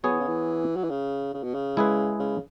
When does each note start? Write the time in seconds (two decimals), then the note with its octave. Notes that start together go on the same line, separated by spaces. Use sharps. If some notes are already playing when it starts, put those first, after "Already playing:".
0.03 F#3 B3 G#4 C#5
0.11 E3
0.20 C#3
0.27 E3
0.76 F#3
0.84 E3
0.90 C#3
1.34 C#3
1.43 B2
1.54 C#3
1.77 G#3 E4 G#4 B4
2.20 C#3